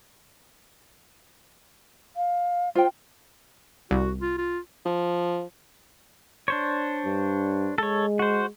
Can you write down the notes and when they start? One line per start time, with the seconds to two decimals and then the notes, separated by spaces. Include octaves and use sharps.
2.16 F5
2.75 F4 C5 G5
3.91 C2 F#4
4.21 F4
4.38 F4
4.85 F3
6.48 D4 C5 C#5
7.06 G2
7.78 G#3 A4 C#5
8.19 F#4 C5